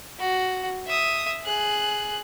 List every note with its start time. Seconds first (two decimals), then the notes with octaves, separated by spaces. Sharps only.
0.19 F#4
0.87 E5 D#6
1.45 G#4 F#6